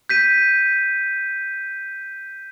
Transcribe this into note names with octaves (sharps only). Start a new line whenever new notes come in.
G6 B6 D#7